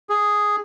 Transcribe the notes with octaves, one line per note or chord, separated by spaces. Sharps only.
G#4